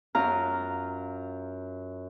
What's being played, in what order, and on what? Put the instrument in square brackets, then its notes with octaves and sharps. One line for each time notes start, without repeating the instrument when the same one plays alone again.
[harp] F#2 F4 A#5 F6